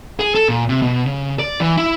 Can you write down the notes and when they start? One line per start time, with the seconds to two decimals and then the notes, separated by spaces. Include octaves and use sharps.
0.19 G#4
0.35 A4
0.49 A#2
0.69 C3
0.82 B2
1.06 C#3
1.39 D5
1.60 E3
1.77 E4